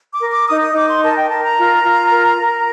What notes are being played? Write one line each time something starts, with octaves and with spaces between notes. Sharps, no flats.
D6
A#4
D6
D#4 D#6
D#6
D#4 D6
C6
A#4 A5
G5
A#4 A5
A#5
F4
F4
A#4
A#4